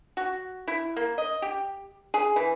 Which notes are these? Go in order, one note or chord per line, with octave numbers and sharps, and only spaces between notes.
F#4
E4
A#3
D#5
G4
G#4
E3